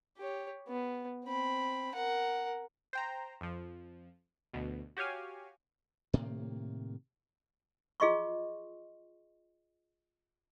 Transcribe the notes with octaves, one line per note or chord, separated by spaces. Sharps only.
G4 C#5
B3
C4 B5
A#4 F#5
C5 G5 A#5
F2 F3
D2 B2
F#4 G4 C#5 F5 G#5
A2 C3 D#3 A#3
F4 G#4 D#5 C6 C#6